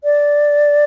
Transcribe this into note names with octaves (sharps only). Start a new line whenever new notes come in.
D5